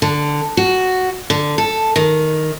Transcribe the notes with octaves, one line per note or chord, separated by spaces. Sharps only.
D3
F#4
D3
A4
D#3